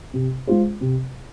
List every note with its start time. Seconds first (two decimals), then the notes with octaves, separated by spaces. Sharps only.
0.14 C3
0.47 G#3 F4 C5
0.81 C3